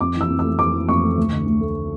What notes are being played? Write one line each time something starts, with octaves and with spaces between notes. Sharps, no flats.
F2 D6
E3 E6
F2
A3 E6
F2 D6
E3
F2 C#6
A3
D2
D3
D2
A3